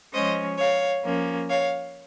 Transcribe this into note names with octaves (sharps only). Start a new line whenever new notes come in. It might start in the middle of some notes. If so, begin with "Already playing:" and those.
F3 G#3 C#4 C5 D#5
C#5 F5
F3 A#3 C#4
C#5 F5